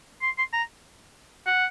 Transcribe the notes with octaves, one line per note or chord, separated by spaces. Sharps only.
C6
C6
A#5
F#5